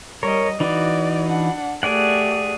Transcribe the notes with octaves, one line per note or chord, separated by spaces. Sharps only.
G3 A#4 C#5 D#5
E3 D#4 F#4 D5
D4 F#5
A3 G4 G#4 D5 F#5